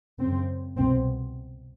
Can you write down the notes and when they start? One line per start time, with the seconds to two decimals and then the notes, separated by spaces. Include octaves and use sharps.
0.19 F#2 C#3 C4
0.77 C2 B2 C4